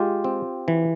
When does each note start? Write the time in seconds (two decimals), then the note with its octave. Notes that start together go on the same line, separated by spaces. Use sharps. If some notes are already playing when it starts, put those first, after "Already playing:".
Already playing: G#3 F4 G4
0.24 C4
0.68 E3